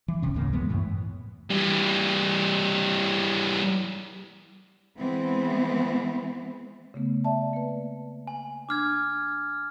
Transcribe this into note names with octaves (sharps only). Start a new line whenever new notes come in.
E3
D#1 C3 C#4
C#2 G#2 C#3 A#3
F#2 E3 G#3 B3
F#2 A2 E3
E3 G3
E3 G#3 B3 C4
C#3 A3 B3
D5 E5 A5
A#3 B4
G#5
D4 D6 F6 G#6